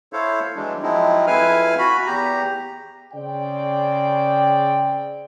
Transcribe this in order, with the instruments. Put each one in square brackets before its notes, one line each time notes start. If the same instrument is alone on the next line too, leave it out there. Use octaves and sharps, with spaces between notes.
[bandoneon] E4 A4 C5 C#5 F5
E3 F#3 G#3 D4
F3 F#3 G#3 C4 D#4 E4
F2 E4 B4 F5 G#5 F6
F#4 B5
E2 G4 A#5
[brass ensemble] C#3 C4 D5 G5